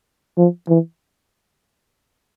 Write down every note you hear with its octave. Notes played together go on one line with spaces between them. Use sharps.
F3
E3